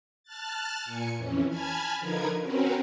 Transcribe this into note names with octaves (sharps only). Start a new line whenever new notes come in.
A5 F6 F#6 A6
A#2 G#5 C#7
F2 E3 C#4
G#5 A5 B5 F6 G#6
D3 F3 D#4 A#4 B4 G#6
C4 C#4 F#4 A#4 B4